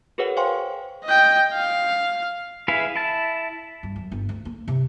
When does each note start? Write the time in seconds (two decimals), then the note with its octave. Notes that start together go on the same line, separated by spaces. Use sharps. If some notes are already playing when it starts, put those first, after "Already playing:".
0.18 F#4 G#4 A#4 B4 C#5 F#5
0.37 C5 F5 G5 G#5 C6 C#6
1.05 D#5 G5
1.54 F5
2.68 E4 G#4 B4 F5
2.96 E4 A5
3.83 G2
3.96 F#2
4.12 G1
4.29 D2
4.45 A#3
4.68 C3